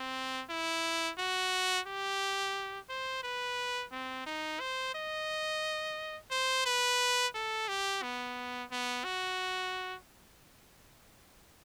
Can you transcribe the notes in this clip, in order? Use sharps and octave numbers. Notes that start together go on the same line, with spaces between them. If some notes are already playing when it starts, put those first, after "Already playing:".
Already playing: C4
E4
F#4
G4
C5
B4
C4
D#4
C5
D#5
C5
B4
A4
G4
B3
B3
F#4